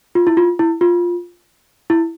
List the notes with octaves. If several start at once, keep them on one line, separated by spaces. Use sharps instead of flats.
F4
E4
F4
E4
F4
E4